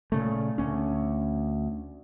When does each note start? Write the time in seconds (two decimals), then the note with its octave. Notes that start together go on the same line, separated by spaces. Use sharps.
0.12 A#2 C#3 A3
0.58 D2 C#4